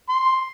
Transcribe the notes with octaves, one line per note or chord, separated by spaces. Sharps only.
C6